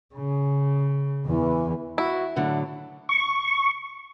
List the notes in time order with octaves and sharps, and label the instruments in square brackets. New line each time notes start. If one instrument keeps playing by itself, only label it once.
[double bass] C#3
[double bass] E2 [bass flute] E3
[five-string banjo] E4 [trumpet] F#4
[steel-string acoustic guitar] A2 D3 F#3 [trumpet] F#5
[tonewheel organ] C#6